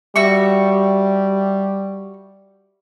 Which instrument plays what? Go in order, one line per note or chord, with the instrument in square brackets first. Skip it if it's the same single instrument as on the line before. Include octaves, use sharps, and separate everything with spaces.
[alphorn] G3 [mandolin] F#4 E5 C#6